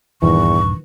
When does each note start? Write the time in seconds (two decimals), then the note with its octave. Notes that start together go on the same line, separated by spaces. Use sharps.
0.22 D#1 E2 G2 D#3 E3 C#6